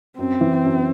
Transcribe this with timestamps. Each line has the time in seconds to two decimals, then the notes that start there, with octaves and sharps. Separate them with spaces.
0.18 F#2 C4
0.41 E3
0.65 F#2